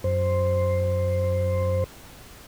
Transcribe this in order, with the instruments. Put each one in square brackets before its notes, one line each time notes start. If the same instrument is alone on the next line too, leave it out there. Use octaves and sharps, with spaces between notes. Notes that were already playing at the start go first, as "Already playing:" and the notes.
[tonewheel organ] F#2 C5